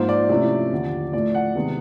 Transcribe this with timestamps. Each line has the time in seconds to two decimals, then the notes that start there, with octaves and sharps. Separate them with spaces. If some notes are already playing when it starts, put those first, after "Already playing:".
Already playing: G#2 F3 A#3 D#4 C5
0.09 D5
0.29 C3 F3 A3 C#4 E4
0.72 D#2 D3 F3
1.13 A2 F3 A3 D5
1.34 F#5
1.55 C3 D#3 G#3 B3